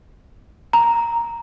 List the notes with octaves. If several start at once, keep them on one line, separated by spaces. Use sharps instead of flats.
A#5